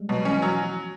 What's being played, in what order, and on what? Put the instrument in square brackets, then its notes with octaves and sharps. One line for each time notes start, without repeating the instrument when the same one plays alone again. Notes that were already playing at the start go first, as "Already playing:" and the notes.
Already playing: [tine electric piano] G3 G#3
[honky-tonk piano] B2 [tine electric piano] F#3
[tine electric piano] E3 [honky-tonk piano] C#4
[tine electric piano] F3 [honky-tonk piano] F#3